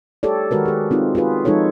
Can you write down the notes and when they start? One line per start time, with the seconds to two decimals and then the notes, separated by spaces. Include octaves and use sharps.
0.23 G4 A4 C#5 D5
0.51 D#3 G#3 F#4 A#4 B4
0.65 G4 G#4
0.91 C4 D#4 F4 G4
1.15 F4 F#4 G#4 B4
1.45 F3 G#3 D#4 F4 A4 C#5